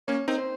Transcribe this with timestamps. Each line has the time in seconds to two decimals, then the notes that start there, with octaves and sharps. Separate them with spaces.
0.08 A#3 C#4 C#5
0.28 C4 D#4 A#4
0.38 C5